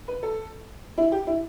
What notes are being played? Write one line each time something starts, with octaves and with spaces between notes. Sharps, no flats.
B4
A4
E4
G4
E4